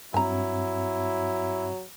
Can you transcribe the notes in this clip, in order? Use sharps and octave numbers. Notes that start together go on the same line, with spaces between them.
G2 F#3 C4 E4 G#5 A#5